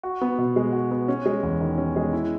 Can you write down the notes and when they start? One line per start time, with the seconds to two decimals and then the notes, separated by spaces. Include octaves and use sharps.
0.03 F#4
0.21 B3
0.38 B2
0.56 G#3
0.73 F#4
0.91 B3
1.08 C#4
1.26 G#3
1.43 E2
1.61 D#3
1.78 C#4
1.96 G#3
2.13 E4